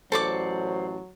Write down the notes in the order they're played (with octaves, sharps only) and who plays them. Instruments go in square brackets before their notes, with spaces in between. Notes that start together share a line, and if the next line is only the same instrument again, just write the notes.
[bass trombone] A1 [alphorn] F#3 [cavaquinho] A4 C#6 D6 [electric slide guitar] C5 D5